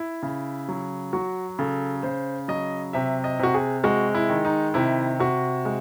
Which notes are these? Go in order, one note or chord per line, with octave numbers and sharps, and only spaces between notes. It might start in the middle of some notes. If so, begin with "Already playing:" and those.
Already playing: E4
C#3
F#3
F#3 F#4
C#3 A4
C#3 C5
F#3 D#5
C3 E5
D#5
C3 F#4
G#4
G#3 F#4
E4
D#3
D#4
C3 E4
C3 F#4
G#3